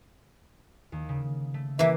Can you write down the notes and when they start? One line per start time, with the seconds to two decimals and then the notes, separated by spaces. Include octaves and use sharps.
0.92 D#2
1.09 C#3
1.54 A3
1.79 E3 A#3 E5